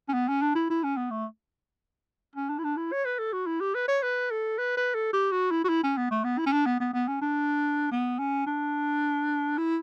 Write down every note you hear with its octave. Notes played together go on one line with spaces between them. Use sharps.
C#4
B3
C#4
D4
E4
E4
C#4
B3
A3
C#4
D4
E4
D4
E4
C#5
B4
A4
F#4
E4
G4
B4
C#5
B4
A4
B4
B4
A4
G4
F#4
E4
F#4
E4
C#4
B3
A3
B3
E4
C#4
D4
B3
B3
B3
C#4
D4
B3
C#4
D4
E4